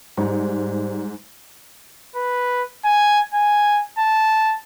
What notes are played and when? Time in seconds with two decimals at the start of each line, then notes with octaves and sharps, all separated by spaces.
0.17 G#2 G3 C5 A#5
2.16 B4
2.85 G#5
3.34 G#5
3.98 A5